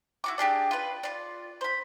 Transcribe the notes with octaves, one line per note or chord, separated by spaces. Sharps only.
E4 F#4 D6
D4 G4 G#4 D5
F4 B4
F4 D5
C5 B5